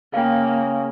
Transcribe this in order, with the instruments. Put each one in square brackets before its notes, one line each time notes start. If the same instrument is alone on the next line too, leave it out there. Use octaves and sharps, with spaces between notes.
[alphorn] C#3 [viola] A#3 [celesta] F5 G5